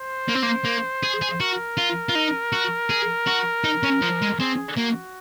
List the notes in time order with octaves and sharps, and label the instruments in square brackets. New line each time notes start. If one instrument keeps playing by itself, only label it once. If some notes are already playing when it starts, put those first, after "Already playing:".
Already playing: [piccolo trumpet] C5
[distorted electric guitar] A#3
C4
A#3
A#3
G#4
G#4
[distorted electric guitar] F#4 [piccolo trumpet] A#4
[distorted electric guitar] F4
F4
D#4
F#4
G#4
F#4
D#4
C#4
F3
G#3
[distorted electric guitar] C4 [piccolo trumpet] G#4
[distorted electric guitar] A#3 [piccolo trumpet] F#4